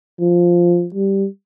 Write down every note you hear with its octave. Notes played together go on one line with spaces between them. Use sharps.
F3
G3